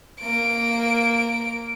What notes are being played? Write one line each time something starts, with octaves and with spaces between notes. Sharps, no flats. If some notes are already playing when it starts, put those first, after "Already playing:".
A#3 D7